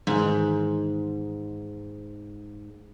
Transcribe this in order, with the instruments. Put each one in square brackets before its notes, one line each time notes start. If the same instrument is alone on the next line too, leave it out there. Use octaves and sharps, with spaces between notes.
[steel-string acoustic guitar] G#2 [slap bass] D#3 E3